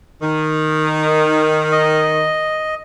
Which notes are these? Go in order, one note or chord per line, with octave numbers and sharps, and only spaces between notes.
D#3
D#5